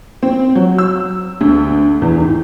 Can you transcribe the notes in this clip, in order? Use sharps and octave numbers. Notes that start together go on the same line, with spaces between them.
C4
F#3
E6
D2
E2
D#3